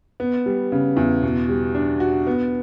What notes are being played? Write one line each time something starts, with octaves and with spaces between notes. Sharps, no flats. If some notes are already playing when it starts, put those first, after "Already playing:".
B3
G3
C#3
E2
B2
G3
D4
F#4
B3